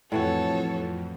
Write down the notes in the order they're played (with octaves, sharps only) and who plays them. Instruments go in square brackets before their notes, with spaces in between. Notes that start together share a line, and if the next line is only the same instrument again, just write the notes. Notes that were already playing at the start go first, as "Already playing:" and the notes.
[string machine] F2 [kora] A2 E3 F#4 [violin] A4 C#5